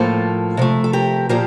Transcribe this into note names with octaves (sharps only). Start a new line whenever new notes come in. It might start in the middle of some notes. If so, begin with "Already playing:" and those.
Already playing: A2 F3 A#3 F4 A4
C3 F3 A3
A4
G4 A#4
A#2 F3 A#3 G4 A#4